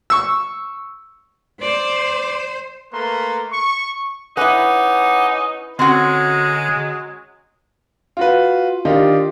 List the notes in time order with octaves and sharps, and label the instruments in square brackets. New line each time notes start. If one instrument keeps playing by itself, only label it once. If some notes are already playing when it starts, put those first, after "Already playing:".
[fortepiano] C#6 E6
[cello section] C5 [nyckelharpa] D5
[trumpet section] A3 A#3 A4 B4 A#5 C6
C#6
[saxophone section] C#4 D#4 [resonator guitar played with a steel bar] E4 B4 [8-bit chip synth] F#5 G#5 D6
[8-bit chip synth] D3 [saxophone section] F#3 G#3 [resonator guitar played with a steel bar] C4 C#4 F#4
[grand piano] F4 F#4 B4
D#3 D4 D#4 F4 G4